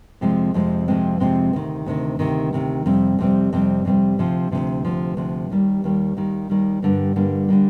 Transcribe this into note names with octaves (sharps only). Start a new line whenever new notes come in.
F2 C3 F3 G#3 C4
F2 C3 F3 G#3 C4
F2 C3 F3 G#3 C4
F2 C3 F3 G#3 C4
D2 C3 D#3
D2 C3 D#3
D2 C3 D#3
D2 C3 D#3
F2 C3 G3 C4
F2 C3 G3 C4
F2 C3 G3 C4
F2 C3 G3 C4
D2 C3 F3
D2 C3 F3
D2 C3 F3
D2 C3 F3
D#2 D#3 G3
D#2 D#3 G3
D#2 D#3 G3
D#2 D#3 G3
G2 D3 G3 A#3
G2 D3 G3 A#3
D3 G3 A#3